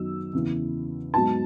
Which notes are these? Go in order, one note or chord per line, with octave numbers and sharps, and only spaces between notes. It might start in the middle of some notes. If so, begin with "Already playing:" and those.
Already playing: F#2 D#3 F#3 B3 D#4 E6
E2 C#3 E3 B3
G#2 F#3 B3 D#4 A5